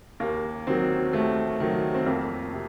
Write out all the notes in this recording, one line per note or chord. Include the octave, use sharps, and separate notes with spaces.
D#2 A#3
D#3 F#3 C4
D#2 A3
D#3 F#3
C4
F2 A#3
C3